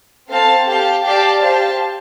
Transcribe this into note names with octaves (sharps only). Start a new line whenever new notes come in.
C4 A4 F5 A5
G4 F5 A5
G4 D5 F5 A5
G4 C5 F5 A5